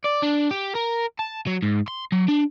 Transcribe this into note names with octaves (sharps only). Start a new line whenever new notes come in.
D5
D4
G4
A#4
A5
F#3
G#2
C6
F#3
D4